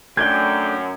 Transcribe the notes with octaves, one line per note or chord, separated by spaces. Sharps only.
F#2 A3 D4 G5 G#6